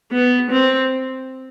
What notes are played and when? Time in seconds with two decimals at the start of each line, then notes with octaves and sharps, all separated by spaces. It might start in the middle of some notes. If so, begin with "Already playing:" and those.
0.12 B3
0.51 C4